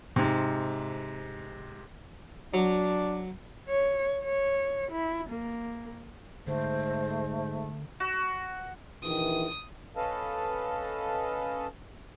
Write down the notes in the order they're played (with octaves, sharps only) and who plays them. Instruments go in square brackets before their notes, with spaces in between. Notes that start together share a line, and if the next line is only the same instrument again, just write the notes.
[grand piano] G#2 C3
[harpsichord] F#3 [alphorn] D4
[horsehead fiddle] C#5
C#5
E4
A#3
[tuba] G#2 [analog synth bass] D3 [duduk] A3 [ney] C5
[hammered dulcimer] F#4
[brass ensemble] A#1 D#3 E3 [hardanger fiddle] D#6
[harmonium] C#4 A4 B4 D#5 F5 A5